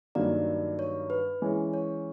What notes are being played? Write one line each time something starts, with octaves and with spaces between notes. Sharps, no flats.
G2 D#3 F#3 A#3 D#4 D5
C#5
B4
E3 G#3 C#4
C#5